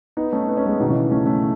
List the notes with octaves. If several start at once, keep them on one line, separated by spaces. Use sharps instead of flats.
B3 D#4
A3 C#4
B3
C#4
G#3 B3
B2 D#3
C#3 E3
A3 C#4
A3 C#4